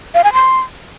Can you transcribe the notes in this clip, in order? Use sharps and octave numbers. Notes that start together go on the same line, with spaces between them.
F5
G#5
C6